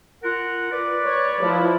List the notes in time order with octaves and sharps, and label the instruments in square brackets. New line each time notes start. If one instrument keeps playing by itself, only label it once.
[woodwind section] F4 A#4 F#5
B4 D5
[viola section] C#5
F3 E4